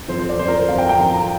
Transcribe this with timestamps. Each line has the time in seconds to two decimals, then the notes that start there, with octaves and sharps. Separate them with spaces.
0.08 F2 F3 C5
0.18 C5
0.29 D5
0.38 F2 F3 C5
0.48 A#4
0.58 C5
0.68 F2 F3 F5
0.78 G5
0.89 G5
0.98 F2 F3 A#5
1.13 A#5